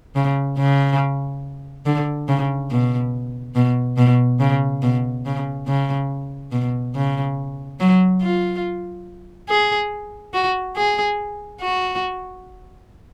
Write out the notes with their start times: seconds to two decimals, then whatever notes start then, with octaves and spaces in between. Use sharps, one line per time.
0.16 C#3
0.58 C#3
1.86 D3
2.28 C#3
2.71 B2
3.55 B2
3.97 B2
4.40 C#3
4.83 B2
5.26 C#3
5.68 C#3
6.52 B2
6.95 C#3
7.80 F#3
8.22 F4
9.49 G#4
10.34 F#4
10.77 G#4
11.61 F#4